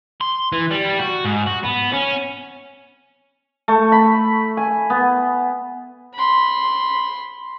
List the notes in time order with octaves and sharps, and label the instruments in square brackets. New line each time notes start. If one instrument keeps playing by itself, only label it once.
[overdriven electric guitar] C6
E3
G3
F#4
G#2
F#4
B3
C#4
[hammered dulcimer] A3
B5
G#5
B3
[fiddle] B5 C6